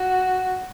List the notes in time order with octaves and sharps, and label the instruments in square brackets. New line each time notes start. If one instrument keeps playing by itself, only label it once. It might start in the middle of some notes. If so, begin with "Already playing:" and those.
Already playing: [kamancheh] F#4